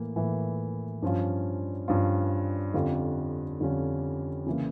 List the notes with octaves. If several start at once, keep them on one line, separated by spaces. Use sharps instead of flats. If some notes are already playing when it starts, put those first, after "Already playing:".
Already playing: A2 E3 A#3
A2 E3 A#3
G2 F3 C#4 F4
G2 F3 C#4 F4
F2 D3 G3 C#4 F4
F2 D3 G3 C#4 F4
C#3 E3 A#3